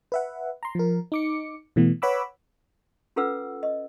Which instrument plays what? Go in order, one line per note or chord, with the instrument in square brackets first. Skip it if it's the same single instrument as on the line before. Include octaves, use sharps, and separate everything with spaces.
[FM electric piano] B4 E5 F#5
A#5 C6
F3 A#4
D#4 D6 C#7
B2 E3 A3 B3
B4 C#5 F#5 B5 D6 E6
[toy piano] C#4 F4 A4 B4 F#5 E6
D#5